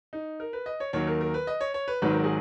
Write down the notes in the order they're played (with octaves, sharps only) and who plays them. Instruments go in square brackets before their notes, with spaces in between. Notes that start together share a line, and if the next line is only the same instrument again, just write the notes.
[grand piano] D#4
A#4
B4
D#5
C#5
D#2 D#3 F#3 C#5
A#4
A#4
B4
D#5
C#5
C#5
B4
G#1 G#2 D#3 F#3 B4
A#4
G#4